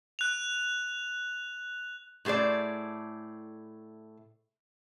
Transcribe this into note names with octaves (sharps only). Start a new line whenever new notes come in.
F#6 F7
A2 A3 G#4 C5 D5